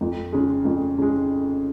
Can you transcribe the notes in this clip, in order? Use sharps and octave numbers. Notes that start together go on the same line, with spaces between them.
F2
C#3 G#3
F2
C#3 G#3